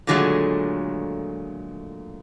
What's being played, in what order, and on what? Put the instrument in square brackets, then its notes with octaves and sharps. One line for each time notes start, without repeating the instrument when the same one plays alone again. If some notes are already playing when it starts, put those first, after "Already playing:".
[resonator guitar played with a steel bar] A#2 D3 D#3 F#3 G#3 A3